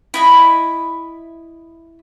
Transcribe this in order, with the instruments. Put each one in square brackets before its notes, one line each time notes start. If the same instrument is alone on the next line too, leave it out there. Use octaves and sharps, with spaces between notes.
[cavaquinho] E4 D#5 B5